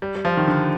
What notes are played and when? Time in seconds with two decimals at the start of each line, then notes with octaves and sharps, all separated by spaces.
0.02 G3
0.15 G3
0.25 F3
0.37 D#3
0.48 D3